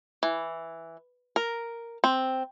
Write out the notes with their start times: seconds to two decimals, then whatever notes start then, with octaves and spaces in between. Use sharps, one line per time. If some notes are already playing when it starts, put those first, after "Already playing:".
0.23 E3
1.36 A#4
2.04 C4